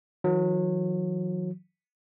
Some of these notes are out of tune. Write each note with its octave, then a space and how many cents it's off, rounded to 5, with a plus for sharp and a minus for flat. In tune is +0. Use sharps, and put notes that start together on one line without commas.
D#3 +40 F#3 -30